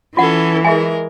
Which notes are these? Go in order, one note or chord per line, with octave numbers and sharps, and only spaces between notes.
E3 C#4 F4 A4 F#5
G#3 G#4 A#4 E5 G#5